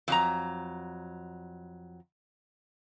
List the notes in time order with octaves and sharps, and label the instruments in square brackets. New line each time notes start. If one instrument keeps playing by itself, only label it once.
[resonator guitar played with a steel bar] F2 F#3 A#5